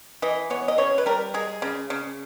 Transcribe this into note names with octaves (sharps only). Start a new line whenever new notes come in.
E3 D#5
B3 C#5
D#5
C#3 C#5
B4
G3 A#4
G#3 G#4
C#3
C#3